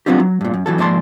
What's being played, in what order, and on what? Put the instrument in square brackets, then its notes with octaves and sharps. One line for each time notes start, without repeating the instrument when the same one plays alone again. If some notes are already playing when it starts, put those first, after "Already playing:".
[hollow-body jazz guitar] F#3 B3 C4 D4 F4 G4
F#3
G2 A#2
F#2
E3 F#3 A4
G#2 F3 A#3 D5 A5 C6